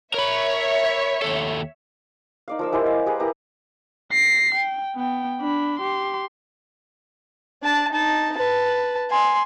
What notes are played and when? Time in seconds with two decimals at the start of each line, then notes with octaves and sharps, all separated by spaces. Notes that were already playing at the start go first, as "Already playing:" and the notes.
0.14 A#4 C#5 E5 B5
1.22 D#2 A4
2.48 D#4 D5 F5
2.59 F3 A#4 E6
2.72 G#3 E4 G4 C5
2.86 F5
3.06 G4 G#4 A#4 B4
3.19 E4 G4 A#5 D#6
4.12 A#6 C7
4.55 G5
4.96 B3 G5
5.41 D4 B5
5.79 G4 C6
7.63 D4 A5
7.92 D#4 A5
8.37 B4 A5
9.11 G#5 C6